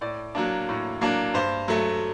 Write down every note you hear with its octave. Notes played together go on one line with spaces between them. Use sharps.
A2 D5
F#3 A#3 D4
A2
F#3 A#3 D4
G2 C5
F#3 A3